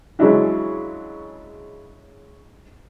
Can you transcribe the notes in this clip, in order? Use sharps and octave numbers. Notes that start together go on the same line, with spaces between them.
C#3 F#3 G#3 D4 E4 F#4